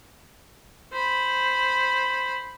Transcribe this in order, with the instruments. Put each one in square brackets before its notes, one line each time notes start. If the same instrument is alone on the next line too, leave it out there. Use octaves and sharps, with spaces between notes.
[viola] C5 B5